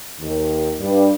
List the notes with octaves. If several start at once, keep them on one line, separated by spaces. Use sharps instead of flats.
D#2
G2